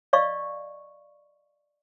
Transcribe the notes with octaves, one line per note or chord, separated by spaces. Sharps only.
D5 D#5 F5 C#6